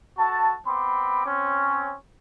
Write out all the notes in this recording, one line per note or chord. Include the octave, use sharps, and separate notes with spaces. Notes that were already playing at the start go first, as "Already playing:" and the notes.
F#4 A4 A5
B3 C4 B5 C6 D6
C4 C#4